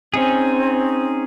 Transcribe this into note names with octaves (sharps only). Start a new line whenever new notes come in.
C4 C#4 D#4 G#4